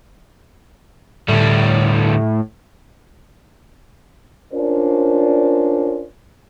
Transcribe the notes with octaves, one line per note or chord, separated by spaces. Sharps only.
D2 A2 G3
C#4 D4 F4 A#4 C5 D5